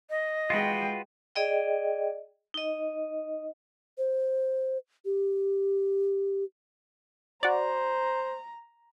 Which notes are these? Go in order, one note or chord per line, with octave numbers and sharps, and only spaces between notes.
D#5
G#3 F4 F#4 B4 G5
G#4 D5 D#5 G5
D#4 D#5
C5
G4
F#4 C5 D5 A#5